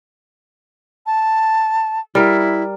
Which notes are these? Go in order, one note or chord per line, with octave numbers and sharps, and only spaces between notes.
A5
G3 E4 A#4